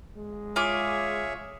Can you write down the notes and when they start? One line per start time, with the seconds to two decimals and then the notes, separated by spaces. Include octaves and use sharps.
0.17 G#3
0.56 F4 G#4 C#5 E5 G#5 D6